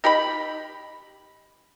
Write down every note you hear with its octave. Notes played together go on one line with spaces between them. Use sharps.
D#4 G4 G5 B5